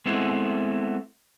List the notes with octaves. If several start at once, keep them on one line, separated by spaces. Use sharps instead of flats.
G#3 A3 B3 C4 E4